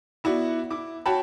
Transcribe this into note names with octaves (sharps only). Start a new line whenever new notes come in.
B3 E4 F#4 D5
E4 D6
F#4 C#5 G5 A5 B5